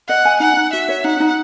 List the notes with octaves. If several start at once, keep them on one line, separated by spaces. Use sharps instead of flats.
D#5 F#5
G#5
D#4 F#5
D#4
F#4 E5
C#5
D#4 F#5
D#4